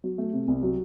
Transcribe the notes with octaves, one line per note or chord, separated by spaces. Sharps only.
F#3
A3
C3
C2
F#3